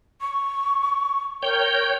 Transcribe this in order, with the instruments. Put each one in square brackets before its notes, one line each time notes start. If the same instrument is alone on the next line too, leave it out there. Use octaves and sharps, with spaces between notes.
[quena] C#6
[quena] A#4 [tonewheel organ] C#5 G5 G6